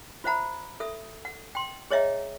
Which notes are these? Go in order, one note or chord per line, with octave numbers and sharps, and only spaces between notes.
F4 C5 E5 F#5 A#5 B5
A4 E5 D#6
F#5
G5 C6
G#4 C#5 D#5 E5 G5 A#5